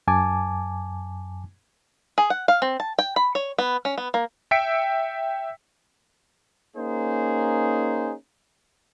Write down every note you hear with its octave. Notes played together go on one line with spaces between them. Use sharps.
F#2 G#5 A5 D6
G#4
F#5
F5
C4
A5
G5
B5
C#5
B3
C#4
B3
A#3
E5 G5 E6 B6 C#7 D7
A#3 C#4 D#4 G#4 C5